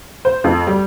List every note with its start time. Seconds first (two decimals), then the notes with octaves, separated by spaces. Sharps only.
0.25 C5
0.44 F2
0.67 G3